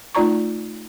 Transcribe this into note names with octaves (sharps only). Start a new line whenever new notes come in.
A3 D#4 F4 D5 A#5 C#6